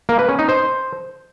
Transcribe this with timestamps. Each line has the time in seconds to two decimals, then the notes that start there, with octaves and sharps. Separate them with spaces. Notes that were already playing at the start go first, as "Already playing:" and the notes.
0.09 A#3
0.19 B4
0.29 C#4
0.39 D#4
0.49 C5